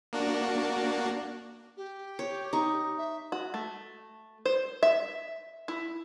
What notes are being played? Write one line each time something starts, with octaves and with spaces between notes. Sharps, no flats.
A#3 D4 F#4
G4
C#5
D#4 C#6
E5
F#4
A3
C5
E5
E4